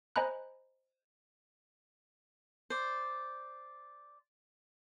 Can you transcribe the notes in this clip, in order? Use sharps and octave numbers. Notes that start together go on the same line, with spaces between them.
C5 D#5 G#5 A#5 B5 F#6
C5 D5